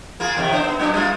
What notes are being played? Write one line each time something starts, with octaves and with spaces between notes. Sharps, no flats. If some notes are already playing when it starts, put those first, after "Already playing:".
A#3 F4 G#4
E2 C3 D#3
D4 C5
B3
A#2 F#3 D4
G3 A#3 F4